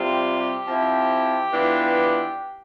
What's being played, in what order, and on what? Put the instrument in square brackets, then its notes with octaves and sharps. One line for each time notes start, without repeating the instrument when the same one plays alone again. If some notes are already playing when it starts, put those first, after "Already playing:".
Already playing: [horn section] C3 G3 C4 F4
G4
G4
F3 C4 E4
E3 B3 D4 F4